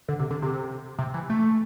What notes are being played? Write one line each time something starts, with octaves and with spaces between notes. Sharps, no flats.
D3
C3
D3
C3
C3
E3
A3